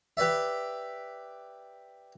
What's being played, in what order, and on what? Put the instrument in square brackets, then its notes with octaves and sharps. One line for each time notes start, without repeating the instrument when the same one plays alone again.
[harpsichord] G4 B4 D5 E5